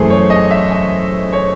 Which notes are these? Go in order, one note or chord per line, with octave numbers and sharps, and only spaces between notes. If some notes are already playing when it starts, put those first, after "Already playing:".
Already playing: F#2 E3 A3 G#4 C5
C#5
D#5
E5
D#5
C#5